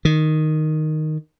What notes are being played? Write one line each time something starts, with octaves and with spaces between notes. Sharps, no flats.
D#3